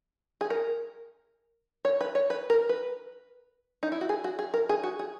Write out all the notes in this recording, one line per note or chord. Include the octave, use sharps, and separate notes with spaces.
G#4
A#4
C#5
B4
C#5
B4
A#4
B4
D#4
E4
F#4
G#4
F#4
G#4
A#4
G#4
F#4
G#4